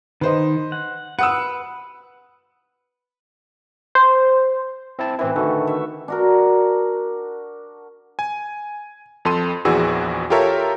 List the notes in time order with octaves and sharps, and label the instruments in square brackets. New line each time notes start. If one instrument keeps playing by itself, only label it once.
[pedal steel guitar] D#3 [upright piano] B4 C5 D#5
[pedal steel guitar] F#5
[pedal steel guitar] B4 [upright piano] F#5 D#6 E6
[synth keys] C5
[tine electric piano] C4 E4 A5
[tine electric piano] A1 C4 E4 [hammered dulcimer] E3 B4
[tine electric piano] D3 D#3 A4 [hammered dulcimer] A3 F#4
[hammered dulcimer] E5
D4 F#4 A#4
[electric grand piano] G#5
F2 A4 C6 D#7
A#1 E2 E3 F#4 G#4 E6
F4 G4 A4 A#4 C#5 E5